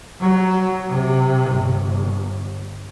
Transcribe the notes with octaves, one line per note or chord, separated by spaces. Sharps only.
F#3
C3
G1